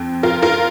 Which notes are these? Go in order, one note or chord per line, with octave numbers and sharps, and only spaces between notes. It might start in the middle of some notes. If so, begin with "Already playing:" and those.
Already playing: F2 C4
F4 A#4
F4 A#4